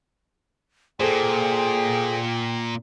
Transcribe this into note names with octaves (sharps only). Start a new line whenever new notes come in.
A#2 G#4 A4 C5 G5